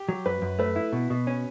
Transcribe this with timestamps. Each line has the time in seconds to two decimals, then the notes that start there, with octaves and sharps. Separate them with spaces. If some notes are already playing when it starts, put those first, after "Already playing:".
Already playing: G4
0.09 F#3
0.26 F#2 B4
0.42 F#2
0.59 A3 B4
0.76 E4
0.93 B2
1.10 B2
1.27 C#4